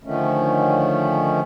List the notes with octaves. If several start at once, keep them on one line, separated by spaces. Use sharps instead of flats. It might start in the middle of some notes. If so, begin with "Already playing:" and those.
D3 D#3 F3 A3 C#4